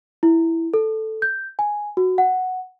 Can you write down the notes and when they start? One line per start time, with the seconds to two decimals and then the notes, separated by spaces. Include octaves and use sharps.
0.23 E4
0.74 A4
1.22 G6
1.59 G#5
1.97 F#4
2.18 F#5